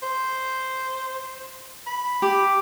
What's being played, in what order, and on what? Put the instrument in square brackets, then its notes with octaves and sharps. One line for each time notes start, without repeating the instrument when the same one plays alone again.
[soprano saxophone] C5
B5
[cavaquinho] G4